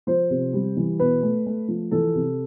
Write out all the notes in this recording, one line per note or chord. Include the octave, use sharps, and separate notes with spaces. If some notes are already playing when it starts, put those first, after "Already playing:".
F3 C5
C3
G3
E3
B2 B4
A3
A3
F3
E3 A4
C3